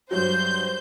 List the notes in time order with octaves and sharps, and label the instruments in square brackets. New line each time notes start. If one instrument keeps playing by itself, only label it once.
[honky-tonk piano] G2 F#3 [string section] C5 G6